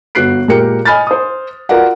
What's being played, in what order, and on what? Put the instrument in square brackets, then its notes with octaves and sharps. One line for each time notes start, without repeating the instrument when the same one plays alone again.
[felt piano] G1 F#4 B4 F#6 C7 D7
A#2 G#3 G4 A#4 G5 C#7
D#5 G#5 B5 F6 A6
C5 D#6
F4 F#4 A#4 B4 D5 F#5